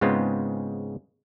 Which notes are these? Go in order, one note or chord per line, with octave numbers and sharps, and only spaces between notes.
G#2 C#3 G#3 B3 C4 F4